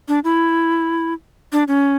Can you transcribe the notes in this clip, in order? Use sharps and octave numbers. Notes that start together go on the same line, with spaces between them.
D4
E4
D4
C#4